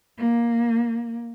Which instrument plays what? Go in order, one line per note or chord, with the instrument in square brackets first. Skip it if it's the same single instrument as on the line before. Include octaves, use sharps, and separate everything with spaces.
[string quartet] A#3